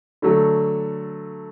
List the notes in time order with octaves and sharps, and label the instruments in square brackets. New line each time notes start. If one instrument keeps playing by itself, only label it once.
[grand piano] D3 F#3 A3